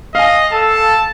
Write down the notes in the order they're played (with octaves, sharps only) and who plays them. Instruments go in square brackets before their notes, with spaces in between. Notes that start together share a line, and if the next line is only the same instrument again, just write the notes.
[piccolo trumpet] D#5 [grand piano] F5 G#5
[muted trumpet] A4 [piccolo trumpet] A5